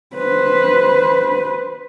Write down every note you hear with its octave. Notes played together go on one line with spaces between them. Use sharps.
B4 C5